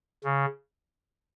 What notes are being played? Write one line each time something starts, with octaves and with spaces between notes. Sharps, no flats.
C#3